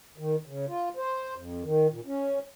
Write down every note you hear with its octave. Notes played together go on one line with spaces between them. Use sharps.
D#3
C#3
F4
C5
F2
D#3
A#2
C#4